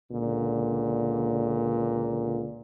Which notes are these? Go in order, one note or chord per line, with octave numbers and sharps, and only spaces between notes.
C#2 A#2 D3